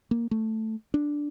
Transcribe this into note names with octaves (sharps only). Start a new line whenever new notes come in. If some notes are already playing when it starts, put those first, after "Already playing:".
A#3
A3
D4